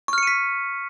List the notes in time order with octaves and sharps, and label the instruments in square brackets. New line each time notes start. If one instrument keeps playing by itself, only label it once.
[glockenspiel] C#6
F6
C#7
D#7
B6